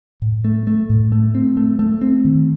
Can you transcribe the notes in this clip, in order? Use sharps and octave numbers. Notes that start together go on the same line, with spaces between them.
A2
A3
A3
A2
A3
C4
A3
A3
C4
D#3